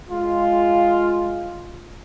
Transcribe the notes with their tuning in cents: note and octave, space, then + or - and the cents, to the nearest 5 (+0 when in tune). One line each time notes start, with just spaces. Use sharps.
G#3 +0 F4 +0